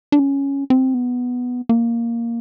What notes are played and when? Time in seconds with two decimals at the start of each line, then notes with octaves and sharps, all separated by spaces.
0.12 D4
0.19 C#4
0.70 C4
0.94 B3
1.69 A#3